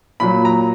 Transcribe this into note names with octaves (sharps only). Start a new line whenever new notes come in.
A#2 F#3 B5
A#5